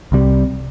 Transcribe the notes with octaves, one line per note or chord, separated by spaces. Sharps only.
C2 C3 G3